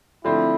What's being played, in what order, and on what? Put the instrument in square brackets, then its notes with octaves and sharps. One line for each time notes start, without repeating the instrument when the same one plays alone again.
[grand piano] D3 F3 A3 C4 [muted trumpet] E4